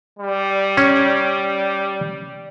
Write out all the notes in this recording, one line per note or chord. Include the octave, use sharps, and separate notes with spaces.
G3
C#4